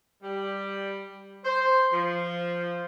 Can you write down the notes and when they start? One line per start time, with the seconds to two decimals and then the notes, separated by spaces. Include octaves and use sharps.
0.22 G3
1.45 C5
1.92 F3